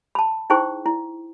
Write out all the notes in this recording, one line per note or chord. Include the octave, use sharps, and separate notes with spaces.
A5 B5
D#4 E4 G#4 C5 G5 C#6
E4